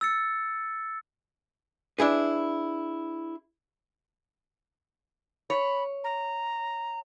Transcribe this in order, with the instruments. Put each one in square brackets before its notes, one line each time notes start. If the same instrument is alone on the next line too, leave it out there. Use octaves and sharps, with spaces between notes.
[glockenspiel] E6 A6 C#7
[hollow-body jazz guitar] D4 E4 G#4 B4
[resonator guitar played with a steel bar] C#5 [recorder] B5
[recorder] A#5